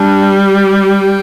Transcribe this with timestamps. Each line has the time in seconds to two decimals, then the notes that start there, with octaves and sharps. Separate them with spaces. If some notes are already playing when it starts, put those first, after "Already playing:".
Already playing: G3 D4
0.55 G4